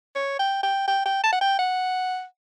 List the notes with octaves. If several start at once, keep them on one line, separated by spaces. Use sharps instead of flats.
C#5
G5
G5
G5
G5
A5
F#5
G5
F#5